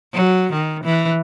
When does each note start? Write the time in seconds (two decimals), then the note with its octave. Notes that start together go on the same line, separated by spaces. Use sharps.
0.13 F#3
0.53 D#3
0.84 E3